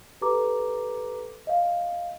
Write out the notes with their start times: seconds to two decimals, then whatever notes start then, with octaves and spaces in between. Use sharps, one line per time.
0.21 G4 A4 B4 A#5 D6
1.47 D#5 F5